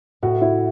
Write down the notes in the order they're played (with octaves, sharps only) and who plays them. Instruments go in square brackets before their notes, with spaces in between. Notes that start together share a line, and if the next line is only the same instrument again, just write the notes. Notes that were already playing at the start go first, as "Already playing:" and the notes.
[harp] A2 [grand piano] F#4
[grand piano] E4